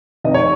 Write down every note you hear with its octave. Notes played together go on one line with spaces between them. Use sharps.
F1 F2 D#3 D#5
C#5